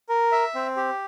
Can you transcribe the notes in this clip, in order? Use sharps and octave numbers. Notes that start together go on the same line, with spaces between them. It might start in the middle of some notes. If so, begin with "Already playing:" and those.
A#4
E5
C4
G4